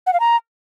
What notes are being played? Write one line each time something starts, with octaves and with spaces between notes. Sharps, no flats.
F#5
F5
A#5